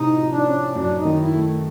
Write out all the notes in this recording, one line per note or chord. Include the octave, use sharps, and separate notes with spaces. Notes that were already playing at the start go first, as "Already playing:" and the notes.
Already playing: A2 C3 D#4
F3
D4
C#4
F#2 D4
D#4
D#3
E4
A3